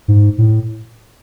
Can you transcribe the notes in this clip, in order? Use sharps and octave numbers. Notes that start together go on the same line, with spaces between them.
G#2
A2